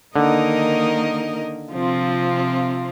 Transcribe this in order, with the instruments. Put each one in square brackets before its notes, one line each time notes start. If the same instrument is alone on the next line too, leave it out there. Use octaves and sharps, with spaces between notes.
[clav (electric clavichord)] D3 [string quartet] D#3 A#3 D#4 A#4 D#5
[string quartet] C3 F3 C4 F4